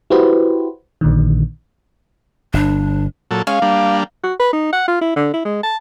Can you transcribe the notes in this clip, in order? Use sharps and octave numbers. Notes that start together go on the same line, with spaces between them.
E4 F#4 G4 B4 C5
A#1 A#2 D3 D#3
G1 D4
A#2 F#3 A4
G#3 C#4 F5
G3 A#3 D4
F#4
B4
D#4
F#5
F4
E4
D3
E4
G#3
A5